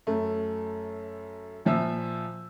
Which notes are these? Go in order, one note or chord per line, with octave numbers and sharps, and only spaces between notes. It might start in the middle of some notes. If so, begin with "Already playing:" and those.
F#2 A3
A#2 F3 E5 E6